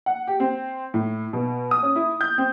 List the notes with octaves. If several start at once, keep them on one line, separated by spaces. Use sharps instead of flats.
F#5
G4
C4
A2
B2
D#6
C#4
E4
G6
C4